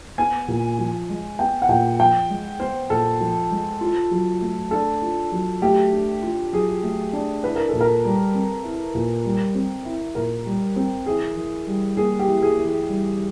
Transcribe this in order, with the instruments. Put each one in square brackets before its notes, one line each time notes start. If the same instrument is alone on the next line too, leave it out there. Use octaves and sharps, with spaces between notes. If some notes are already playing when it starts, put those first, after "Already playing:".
[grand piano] B3 [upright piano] G#5
[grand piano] A#2
F3
G#3
[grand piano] B3 [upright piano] G5
[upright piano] F#5
[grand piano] A#2 [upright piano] G5
[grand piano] F3 [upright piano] G5
[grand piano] G#3
[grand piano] B3 [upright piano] C5
[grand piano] A#2 [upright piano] A4
[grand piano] F3
G#3
F4
F#3
A3
[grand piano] D4 [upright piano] A4
[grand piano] F4
F#3
[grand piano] A3 [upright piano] G4
[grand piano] D4
F4
[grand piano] F#3 [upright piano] G#4
[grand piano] A3
D4
[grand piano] E4 [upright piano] B4
[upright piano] A#4
[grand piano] A#2 [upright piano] A4
[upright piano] A#4
[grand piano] G3
C4
E4
A#2
G3
C4
E4
[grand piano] A#2 [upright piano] A#4
[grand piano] G3
C4
[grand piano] E3 [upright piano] G#4
[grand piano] E3
G3
[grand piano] A#3 [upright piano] G#4
[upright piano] G4
[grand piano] E3
[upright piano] G#4
[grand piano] E3
[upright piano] G#4
[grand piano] G3